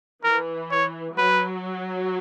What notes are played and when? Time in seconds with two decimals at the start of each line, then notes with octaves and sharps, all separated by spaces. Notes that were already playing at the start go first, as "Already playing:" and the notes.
0.24 E3 A#4
0.71 C#5
1.16 F#3 B4